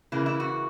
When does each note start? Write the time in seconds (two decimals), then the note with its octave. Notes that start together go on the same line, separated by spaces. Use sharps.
0.12 C#3 E3 A#3 E4
0.26 E4
0.40 F#4